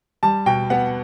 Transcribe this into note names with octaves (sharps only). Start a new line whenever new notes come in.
G3 A5
B2 G5
B3 F#5